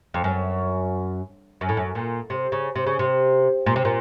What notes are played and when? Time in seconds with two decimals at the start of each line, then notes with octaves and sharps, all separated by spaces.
0.14 F2
0.24 F#2
1.61 F#2
1.69 A2
1.77 F#2
1.95 A#2
2.30 C3
2.52 C#3
2.75 C3
2.86 C#3
2.99 C3
3.66 A#2
3.76 C3
3.85 A#2